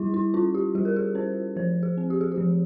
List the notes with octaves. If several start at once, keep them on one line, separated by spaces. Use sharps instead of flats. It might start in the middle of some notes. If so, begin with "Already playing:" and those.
Already playing: G3 E4
E4
C#4 F4
G4
G3 G#4
A#4
G#4
C#4 C5
F3 C5
G#4
C4
G4
G#4
G4
F3